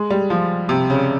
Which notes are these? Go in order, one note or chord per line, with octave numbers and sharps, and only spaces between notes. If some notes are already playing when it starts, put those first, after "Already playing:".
Already playing: G#3
G3
F3
C3
C#3